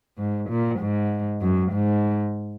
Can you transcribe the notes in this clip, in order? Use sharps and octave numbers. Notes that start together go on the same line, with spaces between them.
G#2
A#2
G#2
F#2
G#2